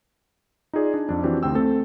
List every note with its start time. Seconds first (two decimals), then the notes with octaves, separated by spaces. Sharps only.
0.73 D#4 F4 G#4 D5
0.94 D4
1.09 F2 D4
1.24 E3 C4 D4 F#4 G4
1.43 D2 C4 G5 E6
1.55 A3 C4 A4